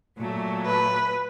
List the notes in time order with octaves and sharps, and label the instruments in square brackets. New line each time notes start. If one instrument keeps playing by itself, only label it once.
[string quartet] A#2 F#3 A3
[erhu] B4